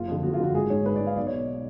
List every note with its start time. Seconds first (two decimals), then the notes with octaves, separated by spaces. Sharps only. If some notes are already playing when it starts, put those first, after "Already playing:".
Already playing: F#1 F4
0.08 F2 D3
0.23 F#1 F#4
0.34 F4
0.39 F2 D3 F#4
0.55 G#1 G#4
0.70 G#2 C#5
0.86 G#1 B4
0.96 G#2 D5
1.07 F5
1.16 B1 D5
1.27 C#5
1.33 B2